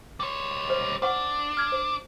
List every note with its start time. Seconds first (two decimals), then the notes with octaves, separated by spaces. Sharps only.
0.20 G3 C#5
0.70 C5
1.02 D4 C5 F#5 C#6
1.57 F6 G#6
1.72 C5